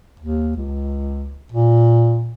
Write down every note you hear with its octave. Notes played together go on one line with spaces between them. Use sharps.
D#2
C#2
A#2